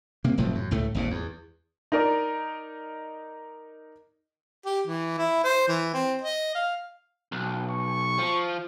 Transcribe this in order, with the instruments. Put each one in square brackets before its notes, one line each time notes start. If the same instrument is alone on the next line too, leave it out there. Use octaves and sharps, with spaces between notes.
[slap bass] C3 A#3
F1 A2 F3 F#3
F#2
C#2 A2 A3
G#1 D#2 A#2
E2
[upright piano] D#4 A#4 D5
[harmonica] G4
E3
E4
C5
E3
C4
D#5
F5
[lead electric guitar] B1
[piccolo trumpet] C#6
[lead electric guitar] F3